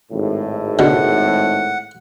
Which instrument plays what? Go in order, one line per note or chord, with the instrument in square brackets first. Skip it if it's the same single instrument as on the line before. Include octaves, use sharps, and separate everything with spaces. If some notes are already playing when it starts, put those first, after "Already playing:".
[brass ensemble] G#1 A2
[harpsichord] B2 D3 [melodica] F#5